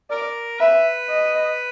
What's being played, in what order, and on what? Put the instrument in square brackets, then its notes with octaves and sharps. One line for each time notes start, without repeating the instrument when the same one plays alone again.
[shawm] A#4 [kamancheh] D5
[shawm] B4 [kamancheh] E5
[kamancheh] D#5